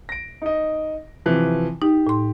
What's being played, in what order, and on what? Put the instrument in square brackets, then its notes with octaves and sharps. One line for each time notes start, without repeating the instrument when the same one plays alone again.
[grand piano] A#6 D7
D#4 D#5
C3 E3 F3
[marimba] D#4 [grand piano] G4
[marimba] A2 C6